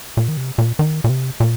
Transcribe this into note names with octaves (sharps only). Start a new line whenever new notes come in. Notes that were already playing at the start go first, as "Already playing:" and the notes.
A#2
D#3
C3
A#2
D#3
A#2
C3
A#2